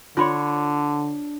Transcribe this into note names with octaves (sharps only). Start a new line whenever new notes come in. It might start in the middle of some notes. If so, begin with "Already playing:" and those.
D3 D4 F4 C#5 B5 C6